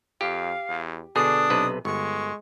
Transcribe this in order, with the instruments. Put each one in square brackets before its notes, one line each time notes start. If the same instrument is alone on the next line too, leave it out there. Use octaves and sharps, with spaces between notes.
[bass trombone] F2 [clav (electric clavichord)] G4 [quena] F5
[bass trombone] E2
[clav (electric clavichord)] B2 D3 G#4 [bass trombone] D4 [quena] D#6
[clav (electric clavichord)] B1 C3 B4
[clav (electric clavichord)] G1 [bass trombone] G#3 [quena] C#6